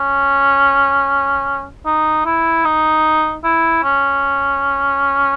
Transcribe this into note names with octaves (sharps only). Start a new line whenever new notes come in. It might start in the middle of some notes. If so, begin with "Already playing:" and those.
Already playing: C#4
D#4
E4
D#4
E4
C#4